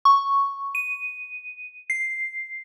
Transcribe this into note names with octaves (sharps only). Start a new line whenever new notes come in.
C#6
D#7
C7